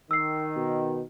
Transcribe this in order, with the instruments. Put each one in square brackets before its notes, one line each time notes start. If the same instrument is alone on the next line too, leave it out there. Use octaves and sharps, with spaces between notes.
[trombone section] D#3 [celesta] E6 C7
[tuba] B2